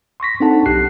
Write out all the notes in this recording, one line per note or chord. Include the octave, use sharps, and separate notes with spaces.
C6 C#6 A#6 B6
C4 D4 D#4 A4 F#5 A5
B1 G4 F#6 C7